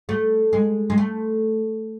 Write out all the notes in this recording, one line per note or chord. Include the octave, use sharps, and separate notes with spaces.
A3
G#3
G#3
A3